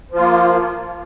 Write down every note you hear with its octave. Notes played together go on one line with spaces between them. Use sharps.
F3 A#3 F4